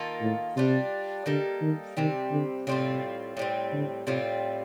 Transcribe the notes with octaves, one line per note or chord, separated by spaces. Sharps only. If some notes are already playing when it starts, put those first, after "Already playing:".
Already playing: D#3 A#3 F4 A4
A2
C3 G3 D4 F4
D3 G3 A#3 D#4 A4
D#3
C3 D#3 G3 C4
D3
A2 C3 G3 C4 F4
A2 G3 C4
D3
A2 C3 G3 C4 F4